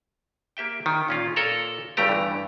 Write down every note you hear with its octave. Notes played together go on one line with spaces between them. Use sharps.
A#3 G4 E5 G5
D#3
A#2 C#4 F4
A#2 A4 A#4 C#5 A#5
G1 G2 C#3 A3 G4 A#5
G2 E3